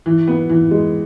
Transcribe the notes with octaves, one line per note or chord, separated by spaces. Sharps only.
E3
B3
E3
G#3